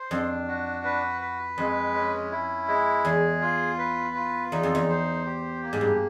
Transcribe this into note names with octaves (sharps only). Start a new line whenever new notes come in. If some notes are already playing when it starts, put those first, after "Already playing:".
Already playing: C5
F2 D4
F#4
B4
B4
F2 G#3
C#4
E4
G#3
E2 G#4
F4
B4
F4
E2 D#4
F2
E2
C5
G4
A#3
G#2
G2